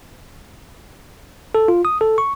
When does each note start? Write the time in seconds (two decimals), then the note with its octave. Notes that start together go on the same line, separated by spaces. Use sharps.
1.55 A4
1.68 F4
1.85 D#6
2.01 A4
2.18 C#6